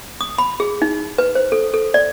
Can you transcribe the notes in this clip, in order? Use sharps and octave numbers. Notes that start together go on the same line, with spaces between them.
D#6
B5
G#4
D#4
B4
C5
A4
A4
D5